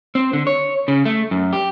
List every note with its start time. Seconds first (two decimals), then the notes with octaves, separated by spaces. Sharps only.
0.15 C4
0.33 D3
0.47 C#5
0.88 C#3
1.05 A3
1.31 F#2
1.53 G4